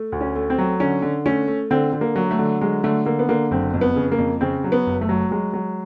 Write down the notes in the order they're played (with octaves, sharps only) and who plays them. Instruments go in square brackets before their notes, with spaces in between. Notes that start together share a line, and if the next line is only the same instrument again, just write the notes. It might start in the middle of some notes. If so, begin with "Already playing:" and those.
Already playing: [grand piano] A3
D2
[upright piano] C#4
[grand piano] A3
[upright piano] C4
[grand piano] F#3
[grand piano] D3 [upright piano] C#4
[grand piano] D3
[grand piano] A3 [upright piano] C#4
[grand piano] A3
[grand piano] D3 [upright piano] C4
[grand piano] D3
[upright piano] A#3
[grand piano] F#3
[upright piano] A3
[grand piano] D3
[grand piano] F#3 [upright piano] G#3
[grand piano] D3 [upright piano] A3
[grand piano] D3 [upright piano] A#3
[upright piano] B3
[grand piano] D3 [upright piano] A#3
[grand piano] F#1 [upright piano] C4
[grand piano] F2
[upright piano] B3
[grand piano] C#3
[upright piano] A#3
[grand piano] F2
[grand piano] C#3 [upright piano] C4
[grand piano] F#3
[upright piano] B3
[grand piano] F#1
[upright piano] A3
[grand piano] F#3
[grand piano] F#3 [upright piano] G#3
[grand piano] F#3